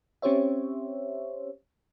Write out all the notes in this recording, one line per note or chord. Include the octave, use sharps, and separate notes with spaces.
C4 C#4 G4 C5 C#5 E5